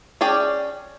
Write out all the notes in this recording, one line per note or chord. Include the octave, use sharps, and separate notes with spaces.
C#4 G#4 D5 G5